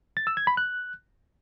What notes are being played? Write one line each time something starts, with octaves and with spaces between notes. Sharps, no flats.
A6
E6
G#6
B5
F#6